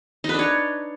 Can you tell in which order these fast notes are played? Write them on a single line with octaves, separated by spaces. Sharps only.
D#4 B4 D4 C#5